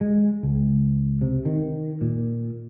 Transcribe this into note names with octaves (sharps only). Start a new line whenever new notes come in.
G#3
C#2
C3
D#3
A#2